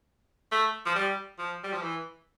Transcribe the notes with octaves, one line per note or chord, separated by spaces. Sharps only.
A3
F3
G3
F3
G3
F3
E3